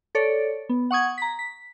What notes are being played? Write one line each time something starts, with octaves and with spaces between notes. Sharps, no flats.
A4 C#5 D5
B3
F#5 C#6 D#6 G#6
A#5 B6
B6